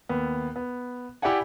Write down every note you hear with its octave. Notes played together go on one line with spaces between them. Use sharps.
D#2 B3
B3
E4 G4 D5 E5 F#5 G#5